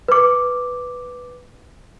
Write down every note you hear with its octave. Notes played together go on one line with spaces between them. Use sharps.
B4 D6